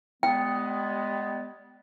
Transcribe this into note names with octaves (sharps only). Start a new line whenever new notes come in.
G3 G#3 B3 G5